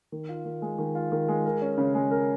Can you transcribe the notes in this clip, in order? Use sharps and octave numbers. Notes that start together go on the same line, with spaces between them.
D#3
F4
D#3
G#3
D#3
F4
D#3
G#3
A#4
C#4
C#3
G#3
A#4